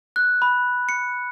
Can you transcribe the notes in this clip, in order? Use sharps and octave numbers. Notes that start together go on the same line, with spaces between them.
F#6
B5
C#7